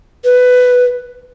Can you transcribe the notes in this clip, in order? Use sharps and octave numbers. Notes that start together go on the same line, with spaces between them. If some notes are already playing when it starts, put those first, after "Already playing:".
B4